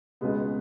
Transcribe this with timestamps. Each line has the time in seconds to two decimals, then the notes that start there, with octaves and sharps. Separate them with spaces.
0.21 C#2 B2 G#3 B3